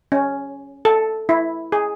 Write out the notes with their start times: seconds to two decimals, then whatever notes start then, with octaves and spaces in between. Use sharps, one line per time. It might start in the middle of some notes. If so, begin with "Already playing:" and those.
0.12 C#4
0.85 A4
1.29 E4
1.72 G#4